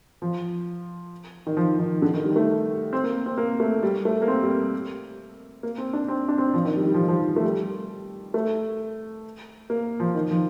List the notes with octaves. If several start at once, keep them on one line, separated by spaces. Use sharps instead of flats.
F3
D#3
F3
D#3
D3
D#3
G3
A3
C4
A#3
C4
A#3
A3
G3
A3
A#3
C4
G3
A#3
C4
D4
C4
D4
C4
F3
D#3
G3
G3
F3
D#3
F3
A3
G3
A3
A#3
F3
D#3
F3